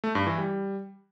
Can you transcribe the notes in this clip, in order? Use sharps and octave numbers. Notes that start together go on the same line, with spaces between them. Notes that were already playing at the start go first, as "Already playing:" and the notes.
A3
G2
E3
G3